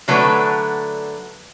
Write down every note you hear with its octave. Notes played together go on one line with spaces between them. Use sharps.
D3 F#3 A3 D4 B4